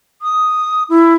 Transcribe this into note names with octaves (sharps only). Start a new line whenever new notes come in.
D#6
E4